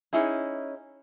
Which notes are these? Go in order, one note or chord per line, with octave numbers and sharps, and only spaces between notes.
C#4 D#4 E4 G#4